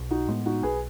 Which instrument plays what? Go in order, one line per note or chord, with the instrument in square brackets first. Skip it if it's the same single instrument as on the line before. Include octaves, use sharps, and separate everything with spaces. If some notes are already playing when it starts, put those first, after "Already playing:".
Already playing: [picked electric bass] B1
[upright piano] D#4 F#4
[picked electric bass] A2 G#3 B3
[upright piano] D#4 F#4
[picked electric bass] B1 [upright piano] G#4 B4